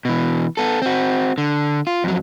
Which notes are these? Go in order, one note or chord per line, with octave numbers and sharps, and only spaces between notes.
B2 E3
B3 A4
C4 F#4
D3
F4
F2 F#3